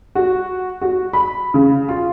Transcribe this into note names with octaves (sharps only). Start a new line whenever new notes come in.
F#4
F#4
B5
C#3
F4